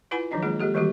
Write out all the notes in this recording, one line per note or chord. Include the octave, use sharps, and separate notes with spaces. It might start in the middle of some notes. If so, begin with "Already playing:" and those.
E4 F4 B4 F#5 G#5 B5
D#3 F3 F#3 D4 D#4 D#5
G#3 A#3 D#4 F4 G#4
G#3 A#3 G4 A4
D#3 E3 G3 A#3 F#4 G4